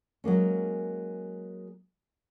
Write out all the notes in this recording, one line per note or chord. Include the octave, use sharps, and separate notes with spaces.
F#3 G#3 A#3 C#4